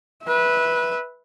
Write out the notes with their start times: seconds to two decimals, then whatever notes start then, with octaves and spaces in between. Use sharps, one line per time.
0.23 B4 E5